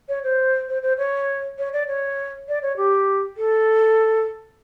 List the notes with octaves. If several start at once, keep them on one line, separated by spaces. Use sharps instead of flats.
C#5
C5
C5
C5
C#5
C#5
D5
C#5
D5
C#5
G4
A4